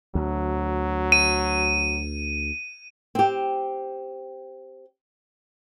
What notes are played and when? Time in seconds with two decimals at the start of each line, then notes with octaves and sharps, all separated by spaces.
0.15 D2 F#3
1.12 D#7
3.15 C4 G4